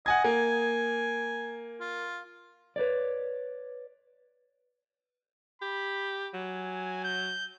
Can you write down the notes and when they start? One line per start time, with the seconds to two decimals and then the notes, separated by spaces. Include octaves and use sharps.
0.06 D#5 F#5 G#5 G#6
0.24 A#3 G#5
1.81 F4
2.76 B4 C#5 D5
5.62 G4 B5
6.34 F#3 G#5
7.04 G6